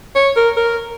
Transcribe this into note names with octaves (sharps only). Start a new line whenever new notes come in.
C#5
A#4
A#4